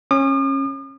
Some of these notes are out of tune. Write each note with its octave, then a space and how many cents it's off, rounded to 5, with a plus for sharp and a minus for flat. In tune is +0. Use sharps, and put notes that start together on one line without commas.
C#4 -25 D#6 -45